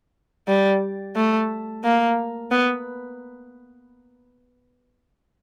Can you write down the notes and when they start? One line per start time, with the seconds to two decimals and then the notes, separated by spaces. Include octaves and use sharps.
0.48 G3
1.16 A3
1.84 A#3
2.51 B3